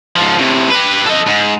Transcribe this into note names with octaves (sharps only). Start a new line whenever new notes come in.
G#2 F3
A2 C3
G4 B4
A4 D#5
G#2